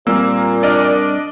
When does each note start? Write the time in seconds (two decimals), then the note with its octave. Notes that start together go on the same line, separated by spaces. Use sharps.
0.07 A#2 G3 A#3 C4 E6
0.63 D4 D5 D#5 F6